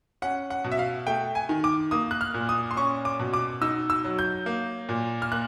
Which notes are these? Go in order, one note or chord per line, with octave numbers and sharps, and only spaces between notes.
C#4 F#5
F#5
B2
E5
F5
A3 G5
G#5
D#3
D6
A#3 D#6
F#6
F6
A#2
D#6
C6
C#4 C#6
D6
B2
D6
D#4 E6
E6
F#3
G6
A#3
A#2
F6
A#3 F#6